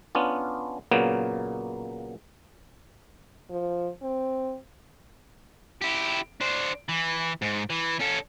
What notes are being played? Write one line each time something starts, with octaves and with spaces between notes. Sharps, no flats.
B3 C#4 D4 F4
A#2 C#3 F#3 A#3 B3
F3
C4
E4 G4
D4 C5
E3
G#2
E3
C#4 A4